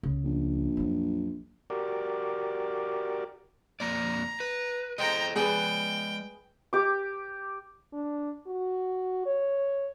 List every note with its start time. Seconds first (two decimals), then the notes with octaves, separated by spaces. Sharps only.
0.03 C#2 C#3
0.24 A#1
0.77 F2 F#3
1.70 F#4 G4 A#4 D5
3.80 F2 A#3 D5 A#5
4.40 B4
4.98 G#3 A4 C5 D#5 G5 A#5
5.36 G#3 G#4 B4 D5 G5
6.73 G4 D6
7.93 D4
8.47 F#4
9.26 C#5